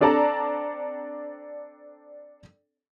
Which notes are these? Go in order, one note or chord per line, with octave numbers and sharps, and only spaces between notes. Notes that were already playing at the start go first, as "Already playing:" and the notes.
C4 D4 A4 D5 A5 A#5